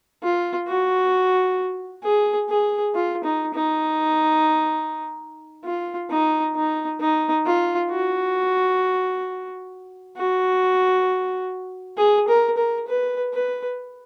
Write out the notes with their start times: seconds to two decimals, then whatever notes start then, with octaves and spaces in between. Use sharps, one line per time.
0.23 F4
0.68 F#4
2.03 G#4
2.49 G#4
2.94 F4
3.24 D#4
3.54 D#4
5.64 F4
6.10 D#4
6.55 D#4
7.00 D#4
7.46 F4
7.90 F#4
10.16 F#4
11.97 G#4
12.28 A#4
12.57 A#4
12.87 B4
13.33 B4